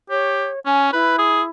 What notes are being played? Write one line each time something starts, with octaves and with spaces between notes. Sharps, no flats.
G4 C#5
C#4 G#5
E4 B4
G#4